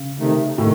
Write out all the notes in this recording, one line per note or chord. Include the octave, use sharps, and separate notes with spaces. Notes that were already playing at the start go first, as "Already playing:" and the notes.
Already playing: C#3
C3 D#3 A3 D#4
A2 C3 D#3